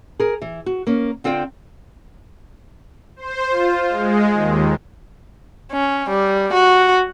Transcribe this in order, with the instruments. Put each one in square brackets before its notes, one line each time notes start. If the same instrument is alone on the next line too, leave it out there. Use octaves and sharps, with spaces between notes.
[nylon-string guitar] G#4 A#4
E3
F#4
A#3 C#4
D3 C4 F4 D5 G5
[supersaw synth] C5
F4
G#3
D#2
[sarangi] C#4
G3
F#4